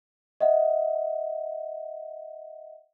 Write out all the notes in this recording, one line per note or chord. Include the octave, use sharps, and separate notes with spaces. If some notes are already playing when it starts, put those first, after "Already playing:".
D#5 E5 F#5